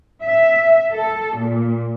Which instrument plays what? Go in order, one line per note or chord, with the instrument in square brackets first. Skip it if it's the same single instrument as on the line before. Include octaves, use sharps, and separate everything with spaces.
[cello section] E5
A4
A#2